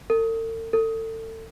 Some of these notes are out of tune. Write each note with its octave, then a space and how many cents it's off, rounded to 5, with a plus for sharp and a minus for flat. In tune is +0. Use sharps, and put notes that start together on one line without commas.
A4 +45
A4 +30